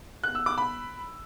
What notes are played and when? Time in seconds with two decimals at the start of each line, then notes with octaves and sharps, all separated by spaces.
0.24 F#6
0.35 E6
0.46 D6
0.58 B5